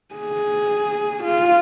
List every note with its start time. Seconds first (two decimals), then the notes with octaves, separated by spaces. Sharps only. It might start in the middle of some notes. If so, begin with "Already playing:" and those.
0.15 G#4
1.24 F4